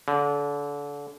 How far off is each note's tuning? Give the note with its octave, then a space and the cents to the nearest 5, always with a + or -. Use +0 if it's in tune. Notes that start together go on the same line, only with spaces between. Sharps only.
D3 -30